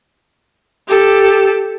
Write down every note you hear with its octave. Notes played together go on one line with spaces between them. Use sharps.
G4 A4